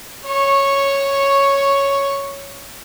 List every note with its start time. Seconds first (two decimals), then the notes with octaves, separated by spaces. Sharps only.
0.26 C#5 C#6